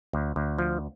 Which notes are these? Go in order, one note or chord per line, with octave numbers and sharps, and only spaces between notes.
D2
D2
F3